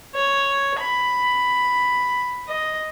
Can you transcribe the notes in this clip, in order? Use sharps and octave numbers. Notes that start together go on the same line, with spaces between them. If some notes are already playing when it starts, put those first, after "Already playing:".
C#5
B5
D#5